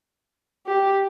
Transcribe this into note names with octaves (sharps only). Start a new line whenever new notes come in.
G4